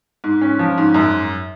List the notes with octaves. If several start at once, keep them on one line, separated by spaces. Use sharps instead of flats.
G#2
C#4
F3
G#2
F#2